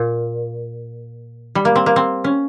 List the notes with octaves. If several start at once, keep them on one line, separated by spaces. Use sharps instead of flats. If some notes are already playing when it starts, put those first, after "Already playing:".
Already playing: A#2
G3
A#3
C4
A#3
C4
C#4